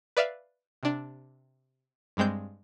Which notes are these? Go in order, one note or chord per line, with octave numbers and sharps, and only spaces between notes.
B4 D5 E5 F5
C3 D4
G2 G3 G#3 C4 G6